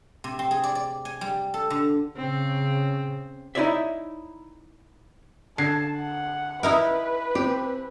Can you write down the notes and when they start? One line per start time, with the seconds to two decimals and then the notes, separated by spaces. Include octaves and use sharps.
0.24 C3
0.39 C4
0.51 G#4
0.64 D5
0.75 D5
1.05 G#5
1.21 G3
1.54 A4
1.70 D3
2.16 C#3 C4
3.55 D#4 E4 F#4 C#5 D5 E5
5.58 D3 A5 G#6 C7
5.96 F#5
6.63 D#4 E4 A#4 B4 E5
7.35 C4 G4